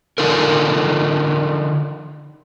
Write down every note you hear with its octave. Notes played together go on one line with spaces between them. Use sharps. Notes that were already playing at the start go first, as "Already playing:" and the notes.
D3 D#4 F4 A4 A#4